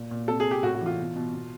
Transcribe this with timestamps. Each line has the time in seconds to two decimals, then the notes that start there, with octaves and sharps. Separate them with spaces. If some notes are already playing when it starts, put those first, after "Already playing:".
Already playing: A#2
0.11 A#2
0.28 C3 A4
0.40 G#4
0.46 C3
0.51 G4
0.63 A2 F#4
0.75 F#4
0.81 E3
0.86 F4
0.99 B2
1.16 B2
1.34 B2